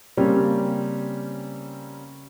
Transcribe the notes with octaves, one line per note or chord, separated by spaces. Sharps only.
C#3 G3 A#3 C4 C#4